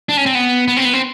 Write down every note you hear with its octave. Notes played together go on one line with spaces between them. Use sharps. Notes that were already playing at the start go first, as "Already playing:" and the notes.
D4
C#4
C4
B3
B3
C4
B3
C4